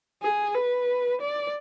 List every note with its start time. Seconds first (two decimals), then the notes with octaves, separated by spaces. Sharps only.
0.22 G#4
0.55 B4
1.21 D5